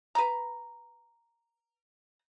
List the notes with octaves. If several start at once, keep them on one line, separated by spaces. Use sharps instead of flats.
B4 A#5